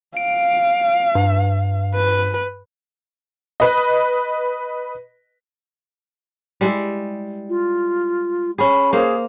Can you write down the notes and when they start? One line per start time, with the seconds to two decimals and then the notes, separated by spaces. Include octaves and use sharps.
0.17 F5 D7
1.15 G2
1.94 B4
3.60 B4 D#5
6.61 G3 G#3 E4
7.49 F4
8.58 C#4 G#4 B5
8.93 A#3 G#4 C5